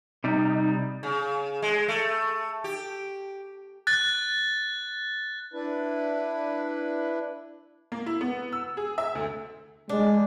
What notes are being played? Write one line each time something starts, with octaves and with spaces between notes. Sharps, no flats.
C3 G3 D#4
C#3
G#3
A3
G4
F#6 A6
D4 E4 B4
A#3
E4
B3
E6
G#4
E5
D2
G#3 D4